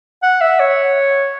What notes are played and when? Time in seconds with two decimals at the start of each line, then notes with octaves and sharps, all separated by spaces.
0.23 F#5
0.41 E5
0.60 C#5